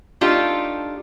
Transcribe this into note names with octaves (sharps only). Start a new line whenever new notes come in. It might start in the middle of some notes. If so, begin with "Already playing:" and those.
A3 D4 D#4 F4 G4